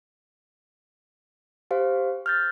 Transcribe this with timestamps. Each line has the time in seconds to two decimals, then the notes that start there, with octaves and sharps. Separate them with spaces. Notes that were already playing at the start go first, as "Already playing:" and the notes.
1.71 G4 C5 F5
2.26 F6 G6 A6